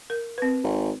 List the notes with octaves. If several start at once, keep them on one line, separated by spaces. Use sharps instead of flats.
A#4
C4 B4
G#1